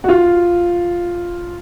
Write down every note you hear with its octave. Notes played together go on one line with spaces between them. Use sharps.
F#4
F4